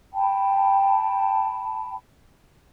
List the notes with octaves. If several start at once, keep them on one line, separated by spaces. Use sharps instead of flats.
G5 A5 B5